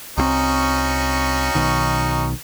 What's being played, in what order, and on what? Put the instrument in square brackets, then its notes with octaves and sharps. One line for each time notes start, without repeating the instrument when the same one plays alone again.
[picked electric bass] C2 E3 C4 [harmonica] C#4 D#4 F#4
[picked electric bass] B1 B2 D#3